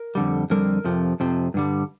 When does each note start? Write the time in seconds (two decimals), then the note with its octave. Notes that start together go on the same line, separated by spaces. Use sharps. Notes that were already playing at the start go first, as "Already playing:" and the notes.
Already playing: A#4
0.15 F2 D3 G3
0.50 F2 D3 G3 A#4
0.84 F2 C3 F3
1.20 F2 C3 F3
1.54 G2 D3 G3